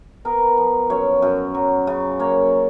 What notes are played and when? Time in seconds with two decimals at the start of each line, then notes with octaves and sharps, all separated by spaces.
0.25 B3 A#4
0.57 F3
0.90 F#2 C#5
1.22 F#2
1.54 F#3
1.87 C#3
2.19 A#3 C#5